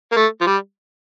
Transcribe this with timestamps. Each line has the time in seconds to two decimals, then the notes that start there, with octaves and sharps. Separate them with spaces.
0.12 A#3
0.16 A3
0.41 F3
0.47 G3